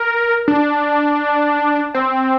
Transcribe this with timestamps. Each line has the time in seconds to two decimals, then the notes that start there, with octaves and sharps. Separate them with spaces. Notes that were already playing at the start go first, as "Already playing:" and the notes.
Already playing: A#4
0.48 D4
1.94 C4